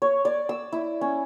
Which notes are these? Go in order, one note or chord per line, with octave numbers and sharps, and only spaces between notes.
C#5
D5
E6
E4
C#4